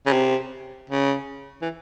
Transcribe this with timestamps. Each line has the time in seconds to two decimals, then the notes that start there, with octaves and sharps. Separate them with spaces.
0.07 C#3
0.13 C3
0.90 C#3
1.62 E3